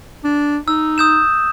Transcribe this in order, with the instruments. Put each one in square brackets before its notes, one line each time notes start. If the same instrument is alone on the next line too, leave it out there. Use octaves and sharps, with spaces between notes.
[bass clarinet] D4
[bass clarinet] D#4 [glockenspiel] E6
[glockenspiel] D#6 G6 E7